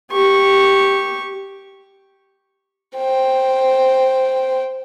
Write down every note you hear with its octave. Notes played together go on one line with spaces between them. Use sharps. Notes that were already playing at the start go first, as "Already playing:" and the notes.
G4 C#6
C5 G5